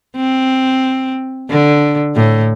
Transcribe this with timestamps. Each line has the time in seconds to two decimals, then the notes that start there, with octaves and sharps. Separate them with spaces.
0.16 C4
1.50 D3
2.16 A2